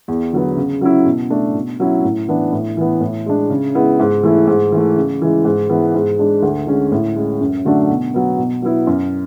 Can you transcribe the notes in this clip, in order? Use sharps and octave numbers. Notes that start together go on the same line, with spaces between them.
E2
D3 F#3 B3
C#3
F#3 C#4 E4
B2
A3 D4
B2
F#3 C#4 E4
A2
E3 B3 D4
A2
E3 B3
A2
G#3 D4
C#3
G#3 B3 E4
G#2
E3 A3 E4
G#2
E3 A3
C#3
E3 G#3
G#2
E3 B3
G#2
G#3 D4
D2
D3 G#3 C#4
A2
G#3 C#4
F#2
D3 F#3 A3 D4
B2
F#3 B3
B2
F#3 B3 E4
F#2